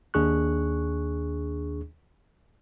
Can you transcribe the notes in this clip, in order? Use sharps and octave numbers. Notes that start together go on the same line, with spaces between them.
D#2 D4 G#4 C#6 F#6